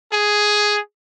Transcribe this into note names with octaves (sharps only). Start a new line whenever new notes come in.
G#4